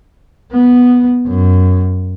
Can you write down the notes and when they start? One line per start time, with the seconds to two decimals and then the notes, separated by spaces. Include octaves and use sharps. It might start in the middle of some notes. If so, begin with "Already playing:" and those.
0.52 B3
1.27 F#2